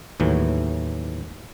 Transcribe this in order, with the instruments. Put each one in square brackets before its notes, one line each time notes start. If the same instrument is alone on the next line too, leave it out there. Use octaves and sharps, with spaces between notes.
[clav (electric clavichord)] D#2 A2 E3 F#3